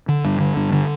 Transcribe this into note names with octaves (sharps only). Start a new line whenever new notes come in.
D3
G2
D3
G2
D3